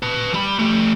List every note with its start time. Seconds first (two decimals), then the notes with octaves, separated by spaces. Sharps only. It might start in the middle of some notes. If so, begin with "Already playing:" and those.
0.02 B4 A5
0.34 G3 B5
0.59 A3 G4